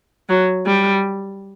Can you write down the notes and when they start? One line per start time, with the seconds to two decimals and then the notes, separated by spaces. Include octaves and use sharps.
0.29 F#3
0.66 G3